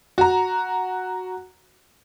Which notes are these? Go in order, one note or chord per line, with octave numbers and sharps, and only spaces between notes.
F#4 A#5